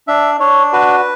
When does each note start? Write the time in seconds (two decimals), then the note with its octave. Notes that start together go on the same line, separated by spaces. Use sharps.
0.08 D4 E5
0.40 D4 C#5
0.73 F#4 B4